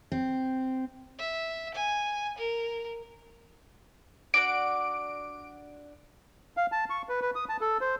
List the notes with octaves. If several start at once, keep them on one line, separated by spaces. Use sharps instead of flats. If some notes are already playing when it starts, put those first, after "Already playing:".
C4
E5
G#5
A#4
D4 F#4 D5 D7
F5
A5
C#6
B4
B4
D#6
A5
A4
C5